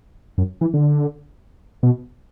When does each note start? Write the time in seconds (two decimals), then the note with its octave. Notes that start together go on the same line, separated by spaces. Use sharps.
0.38 F#2
0.61 E3
0.74 D3
1.83 B2